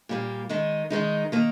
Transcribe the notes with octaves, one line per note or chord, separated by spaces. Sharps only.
A#2 G3 A#3
D#3 G#3 D#4
D#3 G#3 D#4
D#3 A#3